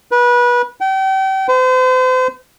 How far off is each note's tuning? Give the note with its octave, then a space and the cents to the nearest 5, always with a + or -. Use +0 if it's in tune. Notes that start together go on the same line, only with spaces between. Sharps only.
B4 -25
G5 -35
C5 -40